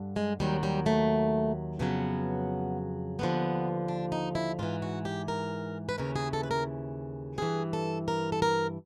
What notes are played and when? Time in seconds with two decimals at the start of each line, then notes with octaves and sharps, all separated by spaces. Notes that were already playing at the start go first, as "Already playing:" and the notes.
Already playing: G2 D3
0.16 G#3
0.40 D#2 D#3 F#3 G3
0.63 G3
0.86 A3
1.79 F2 C#3 F#3 B3
3.19 D#2 D3 F3 B3
3.88 D4
4.12 D#4
4.35 E4
4.59 G#2 E3 F4
4.82 F#4
5.05 G4
5.28 A#4
5.89 B4
5.98 D#2 C#3 E3 A#4
6.16 G#4
6.33 A4
6.43 B4
6.51 A#4
7.38 G2 E3 G#4
7.73 A4
8.08 A#4
8.32 A4
8.42 A#4